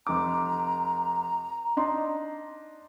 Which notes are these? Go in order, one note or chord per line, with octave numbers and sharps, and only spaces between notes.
F1 A#5 D6
D4 D#4 C6